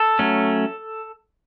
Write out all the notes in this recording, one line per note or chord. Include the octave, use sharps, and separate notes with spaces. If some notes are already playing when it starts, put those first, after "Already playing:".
Already playing: A4
F#3 A3 C#4